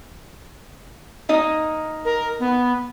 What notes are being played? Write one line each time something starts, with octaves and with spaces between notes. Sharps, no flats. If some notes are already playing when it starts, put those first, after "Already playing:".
A#3 D#4 D#5
A#4
B3